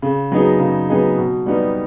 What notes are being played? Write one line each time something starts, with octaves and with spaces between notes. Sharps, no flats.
C#3
F#3 B3 D#4 G#4
C#3
F#3 B3 D#4 G#4
B2
G3 B3 D#4